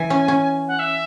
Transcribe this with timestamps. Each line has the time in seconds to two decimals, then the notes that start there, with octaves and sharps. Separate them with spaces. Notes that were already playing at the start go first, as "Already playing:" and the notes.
Already playing: E3 G#5
0.10 C#4
0.28 C#4
0.68 F#5
0.79 E5